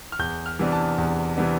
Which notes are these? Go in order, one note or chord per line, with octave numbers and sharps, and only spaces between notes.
F6
E2 G6
F6
C3 E3 B3 D4
A5
E2
C3 E3 B3 D4